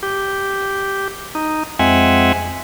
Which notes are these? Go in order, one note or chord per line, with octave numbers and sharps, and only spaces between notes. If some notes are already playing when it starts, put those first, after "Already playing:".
G4
D#4
F2 G#3 C4 E5 F#5 G#5